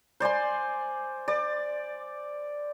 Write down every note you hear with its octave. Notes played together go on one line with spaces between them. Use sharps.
C5 D5 G#5 C6
D5